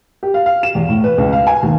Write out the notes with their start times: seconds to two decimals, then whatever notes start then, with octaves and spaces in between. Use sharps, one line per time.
0.23 G4
0.34 F5
0.46 F5
0.63 E7
0.75 E2
0.89 A2
1.04 B4
1.18 C#2
1.33 F5
1.47 G#5
1.63 D#2